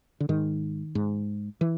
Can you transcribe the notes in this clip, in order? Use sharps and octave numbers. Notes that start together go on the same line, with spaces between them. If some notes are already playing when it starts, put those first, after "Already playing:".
D3
G#2 D#3
G#2
E3